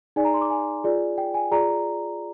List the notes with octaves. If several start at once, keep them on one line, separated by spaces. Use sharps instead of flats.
D#4 G#4 D5 G#5
A#5
C6
D6
G#5
F4 G#4 D5
G5
G#5
F4 G#4 D5 A#5